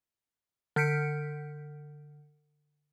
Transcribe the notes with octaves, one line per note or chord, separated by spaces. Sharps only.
D3 F6 G6 B6 C#7 D7